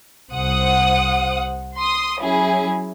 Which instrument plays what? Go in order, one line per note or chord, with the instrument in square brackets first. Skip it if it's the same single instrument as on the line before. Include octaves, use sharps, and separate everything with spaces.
[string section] C2 C5 F#5 D#6
C6 D#6
F#3 C#4 E4 G#4